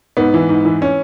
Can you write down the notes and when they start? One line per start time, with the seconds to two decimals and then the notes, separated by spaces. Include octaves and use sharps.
0.17 G#2 B3
0.34 E3
0.49 G#2
0.65 E3
0.82 C#4